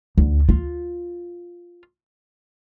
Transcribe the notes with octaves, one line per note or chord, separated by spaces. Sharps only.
D2
F4